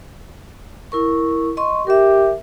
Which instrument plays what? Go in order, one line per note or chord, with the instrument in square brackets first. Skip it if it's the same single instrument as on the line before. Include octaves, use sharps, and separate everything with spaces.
[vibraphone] E4 A#4 C#6
D#5 C6 C#6
[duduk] G4 [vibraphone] A#4 E5